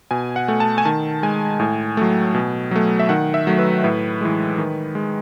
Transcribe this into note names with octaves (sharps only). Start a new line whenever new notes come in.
B2 G#5
F#5
A3
A5
G#5
D#3 A5
G#3 G#5
A2
F#3 A3
B2
F#3 A3
E5
D#3 F#5
E5
F#3 A3
B4
A2 B4
E3 G#3
D#3
G#3